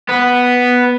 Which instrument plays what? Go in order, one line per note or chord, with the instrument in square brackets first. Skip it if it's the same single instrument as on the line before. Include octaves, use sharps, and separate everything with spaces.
[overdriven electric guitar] B3